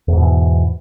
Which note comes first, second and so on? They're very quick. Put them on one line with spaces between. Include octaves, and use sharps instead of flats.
E2 G#2 B2 E3